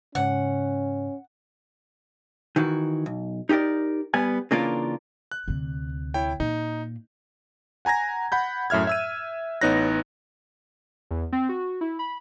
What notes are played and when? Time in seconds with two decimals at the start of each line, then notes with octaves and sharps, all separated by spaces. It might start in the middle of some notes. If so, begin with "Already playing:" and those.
0.15 G#2 C#3 C#4 F#5
2.56 D#3 E3 F#4
3.06 B1
3.49 D#4 G4 G#4 A#4 D5
4.14 G3 B3 G#5
4.51 C#3 E3 A#3 D4 F4 A#4
5.32 F#6
5.48 D2 C3
6.14 E4 C#5 G5
6.40 A#2 D#4
7.85 F#5 G#5 A#5 G#6 A#6
8.32 F#5 B5 G6
8.70 F#2 A2 E5 F6 G#6
8.87 E5 E6 D#7
9.61 A1 B3 D#4 C#5 F#6 A#6
11.11 E2
11.32 C4
11.49 F#4
11.81 E4
11.99 B5